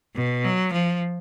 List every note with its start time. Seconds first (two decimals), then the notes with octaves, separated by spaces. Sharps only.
0.15 B2
0.44 F#3
0.73 F3